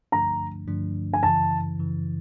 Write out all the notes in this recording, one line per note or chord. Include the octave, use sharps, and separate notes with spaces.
G2 D3 F3 A3 D4 A#5
G2 D3 F3 A3 D4
G#5
F#2 C#3 E3 A5
F#2 C#3 E3